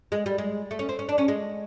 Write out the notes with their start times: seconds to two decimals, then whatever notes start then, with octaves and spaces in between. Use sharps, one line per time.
0.12 G#3
0.26 G3
0.38 G#3
0.71 A3
0.79 C#4
0.89 C4
0.99 C#4
1.09 D4
1.18 C#4
1.28 G#3